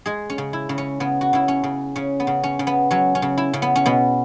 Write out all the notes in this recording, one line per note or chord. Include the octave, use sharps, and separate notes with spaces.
G#3 G#4
C#4
C#3
E4
C#3
C#4
C#3 B3
F#4
C#3 E4
C#4
C#3
C#3 C#4
B3
C#3
C#4
C#3
B3
F#3 C#4
C#4
C#3
E4
C#3
B3
C#4
B2 B3